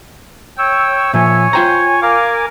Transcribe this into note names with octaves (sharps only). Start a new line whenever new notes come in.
C#5 G5 E6
A#2 F3 C#5 E5 G#5
F4 C5 G5 A#5
A#4 F5 G#5 D6